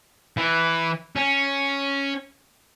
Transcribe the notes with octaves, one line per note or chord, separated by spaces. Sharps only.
E3
C#4